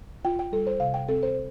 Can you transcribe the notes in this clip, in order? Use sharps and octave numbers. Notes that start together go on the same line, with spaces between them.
F4 G5
G5
G3 A4
C5
C3 F5
G5
C4 A4
C5